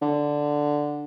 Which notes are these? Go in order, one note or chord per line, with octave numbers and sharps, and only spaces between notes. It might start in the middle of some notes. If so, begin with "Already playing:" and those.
D3